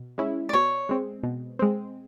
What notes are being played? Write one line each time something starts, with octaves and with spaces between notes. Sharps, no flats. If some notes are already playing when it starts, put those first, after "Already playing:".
Already playing: B2
G#3 C#4 E4
D5
B2 C#5
G#3 C4
B2
G#3 C4